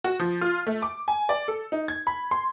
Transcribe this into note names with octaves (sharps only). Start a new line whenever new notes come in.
F#4
F3
F4
A3
D6
G#5
D5
A4
D#4
G#6
B5
C6